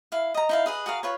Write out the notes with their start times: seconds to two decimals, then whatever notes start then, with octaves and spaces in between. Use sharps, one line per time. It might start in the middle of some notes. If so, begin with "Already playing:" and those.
0.12 E4 F5
0.34 D#5 A#5
0.49 D#4 E4 F5
0.66 G#4 B4 D#5
0.86 F#4 G#4 A#4 F5
1.03 F4 B4 C#5